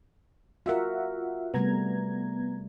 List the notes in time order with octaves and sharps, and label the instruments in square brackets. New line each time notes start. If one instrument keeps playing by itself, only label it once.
[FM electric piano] F4 E5 F#5 [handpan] F#4 A#4
[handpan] C3 G3 A3 [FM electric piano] B3 A#5 G#6